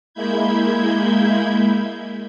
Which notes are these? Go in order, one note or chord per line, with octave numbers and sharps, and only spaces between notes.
G#3 A#3 E4 B5 G6 G#6